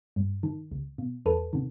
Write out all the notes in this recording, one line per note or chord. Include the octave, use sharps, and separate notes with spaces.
G2
D#3
C#2
B2
E2 A4 B4
C3 D#3